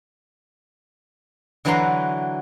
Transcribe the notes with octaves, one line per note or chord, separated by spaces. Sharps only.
D3 E3 F#3 B4 A#5 C6